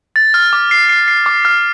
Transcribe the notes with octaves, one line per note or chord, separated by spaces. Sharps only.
A6
F6
D6
C7
C7
C7
D6
F6